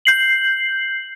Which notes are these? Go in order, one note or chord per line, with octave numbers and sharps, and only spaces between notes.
G6 C7 F#7